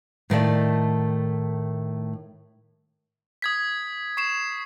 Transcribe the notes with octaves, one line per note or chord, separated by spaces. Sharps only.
A2 D#3 A3 D5
D#6 G#6 B6
C#6 C7 E7